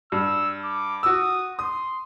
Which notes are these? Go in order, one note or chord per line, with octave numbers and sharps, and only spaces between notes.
G2 E6
D6
F#4 D#6 E6
C6 D#6